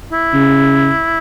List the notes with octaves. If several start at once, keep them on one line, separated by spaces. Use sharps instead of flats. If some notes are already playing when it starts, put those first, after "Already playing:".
E4
C#3